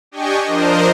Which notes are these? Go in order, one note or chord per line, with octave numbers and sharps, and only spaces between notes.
D4 G4 D#5 G5 G#5 C#6
F3 D4 A#4 C5 D#5